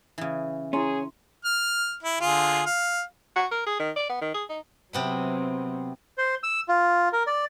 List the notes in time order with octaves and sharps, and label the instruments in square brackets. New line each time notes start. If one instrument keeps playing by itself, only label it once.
[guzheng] C#3 E3
[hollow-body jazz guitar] C#4 [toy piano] E4 A#5 C6 [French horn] G#4
[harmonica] F6
E4
D3 F4 G#4
F5
[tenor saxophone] F#4
A#4
G#4
D#3
D5
B3
D#3
G#4
D#4
[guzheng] C3 B3 E4 [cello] F#3 C4
[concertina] C5
E6
F4
A#4
D5